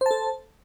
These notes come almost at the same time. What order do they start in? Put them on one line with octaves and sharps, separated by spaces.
C5 A5 A4